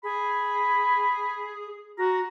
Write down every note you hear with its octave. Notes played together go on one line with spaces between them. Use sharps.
G#4 B5
F#4 A#5